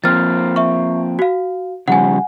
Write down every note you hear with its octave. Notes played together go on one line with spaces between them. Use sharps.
F3 A#3 C4 F6 A6
E5 C#6
F#4 F5
C#3 F3 G3 F#5 G#5